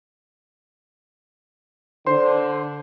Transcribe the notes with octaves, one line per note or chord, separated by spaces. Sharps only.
D3 C5 C6